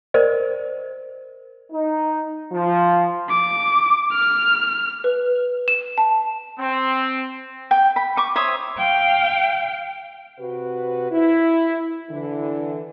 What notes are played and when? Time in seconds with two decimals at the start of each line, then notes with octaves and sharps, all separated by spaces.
0.14 A#4 C5 D5 D#5
1.72 D#4
2.53 F3
3.30 D6
4.13 F6
5.04 B4
5.68 E7
5.98 A5
6.59 C4
7.71 G5
7.96 B5
8.17 C#6 D6
8.36 C5 C#5 E5 D#6
8.77 F5 G5
10.39 C3 F#4 B4
11.12 E4
12.10 D3 E3